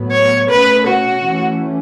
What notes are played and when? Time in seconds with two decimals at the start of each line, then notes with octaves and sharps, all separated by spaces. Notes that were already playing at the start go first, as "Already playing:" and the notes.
Already playing: A2 F#3 B3
0.11 C#5
0.49 B2 A3 C#4 B4
0.87 F#4
1.25 E3 A3 C#4